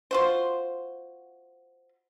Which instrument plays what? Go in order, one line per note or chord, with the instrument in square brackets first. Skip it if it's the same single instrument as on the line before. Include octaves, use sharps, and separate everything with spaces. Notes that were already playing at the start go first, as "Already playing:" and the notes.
[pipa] F4 F#4 C5